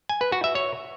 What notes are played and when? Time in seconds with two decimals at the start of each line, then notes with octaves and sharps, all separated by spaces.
0.09 G#5
0.21 B4
0.32 F#4
0.44 E5
0.55 C#5